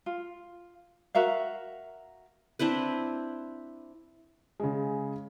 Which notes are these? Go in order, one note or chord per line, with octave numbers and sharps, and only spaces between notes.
F4
F#4 A#4 E5 F5
C4 D4 E4 B4
C#3 G#3